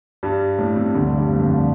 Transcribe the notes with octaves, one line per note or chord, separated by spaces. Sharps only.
G2 G3
A2
C3
D2 D3
G2 G3
G2 G3
F2 F3
D2 D3
F2 F3
G3